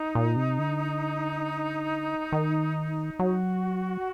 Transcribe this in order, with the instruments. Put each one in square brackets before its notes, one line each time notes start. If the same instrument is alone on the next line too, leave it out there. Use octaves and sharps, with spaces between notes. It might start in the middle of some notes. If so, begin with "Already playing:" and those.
Already playing: [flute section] D#4
[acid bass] A#2
C3
D3
D#3
[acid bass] F#3 [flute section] F#4